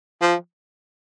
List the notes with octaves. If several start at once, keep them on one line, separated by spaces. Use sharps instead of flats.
F3